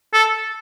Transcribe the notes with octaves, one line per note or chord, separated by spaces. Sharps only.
A4